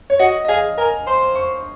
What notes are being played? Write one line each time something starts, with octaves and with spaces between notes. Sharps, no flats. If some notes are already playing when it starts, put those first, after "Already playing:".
C#5
F#4 D#5
D#5
G#4 F5
A#4 G#5
C5 C6
C#6